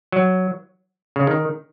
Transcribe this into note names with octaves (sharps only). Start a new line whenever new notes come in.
F#3
C#3
D#3